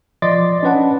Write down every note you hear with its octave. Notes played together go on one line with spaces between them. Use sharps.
F3 D5 D#5 C6 D6 A6
C#4 D4 B4 F#5 A5